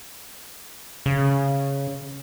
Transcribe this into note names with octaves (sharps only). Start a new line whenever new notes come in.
C#3